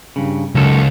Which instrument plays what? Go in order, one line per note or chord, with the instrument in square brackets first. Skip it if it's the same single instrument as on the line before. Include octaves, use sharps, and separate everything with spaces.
[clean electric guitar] G2 C#3
[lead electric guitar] C#2 [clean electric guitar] F#2 D#3 A4